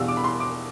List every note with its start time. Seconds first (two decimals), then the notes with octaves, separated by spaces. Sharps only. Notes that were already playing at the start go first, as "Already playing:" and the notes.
Already playing: E2 B2 G3 F5 E6
0.08 D6
0.17 B5
0.24 C6
0.40 D6